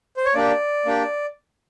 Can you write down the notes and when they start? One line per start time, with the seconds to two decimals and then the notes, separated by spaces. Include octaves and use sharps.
0.17 C5
0.25 C#5
0.34 A#3 D4 G4 D5
0.85 A#3 D4 G4